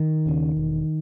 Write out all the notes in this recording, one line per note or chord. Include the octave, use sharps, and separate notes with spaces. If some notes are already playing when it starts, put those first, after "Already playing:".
Already playing: D#3
D#2 C#3
E1